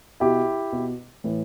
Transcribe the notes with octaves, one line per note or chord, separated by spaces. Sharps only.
B2 E4 G4
B2
A2 E3